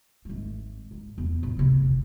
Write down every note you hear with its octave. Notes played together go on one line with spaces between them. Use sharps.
G#1 A3
G#2
E2
A2
C3 B3
F1 D2